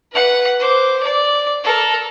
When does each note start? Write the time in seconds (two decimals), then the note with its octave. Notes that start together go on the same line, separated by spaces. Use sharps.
0.12 B4 F#5
0.59 C5 D6
1.03 D5
1.64 A4 A#4